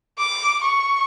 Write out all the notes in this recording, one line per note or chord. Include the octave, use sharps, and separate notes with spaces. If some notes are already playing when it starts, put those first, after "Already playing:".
D6
C#6